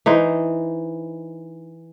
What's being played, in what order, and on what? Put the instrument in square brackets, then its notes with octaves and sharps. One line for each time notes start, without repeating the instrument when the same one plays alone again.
[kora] E3 D#4 C5 D#5